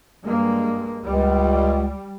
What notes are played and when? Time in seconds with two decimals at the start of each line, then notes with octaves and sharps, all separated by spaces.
0.23 G2 G#3 A#3
1.04 C#2 G3